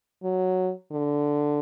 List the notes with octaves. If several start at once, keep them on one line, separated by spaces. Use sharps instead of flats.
F#3
D3